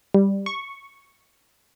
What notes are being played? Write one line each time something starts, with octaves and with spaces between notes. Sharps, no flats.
G3
C#6